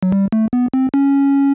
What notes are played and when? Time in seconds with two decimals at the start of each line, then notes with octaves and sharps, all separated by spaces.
0.03 F#3
0.12 G3
0.32 A3
0.53 B3
0.74 C4
0.94 C#4